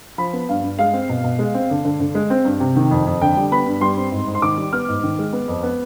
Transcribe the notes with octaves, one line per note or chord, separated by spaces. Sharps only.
F3 B5
B3
G2 F5
G2
G#3 F5
C4
B2
B2
G#3
C4
D3
D3
D3
G#3
C4
G2
C3
D#3
F2
F2
D3 G5
G3
B3 B5
G2
G3 C6
C4
G#2
G#2
C6
D#3 D6
G3
B3 F6
G#2
D#3
G#3
B3
F2
B3